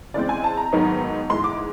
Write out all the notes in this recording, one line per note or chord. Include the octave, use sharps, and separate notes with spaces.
C#3 E3 G#3 C4 D5
G#5
A5
A#5
G#2 D#3 F#3 B3 D#4
G#2 E3 G#3 C6
D6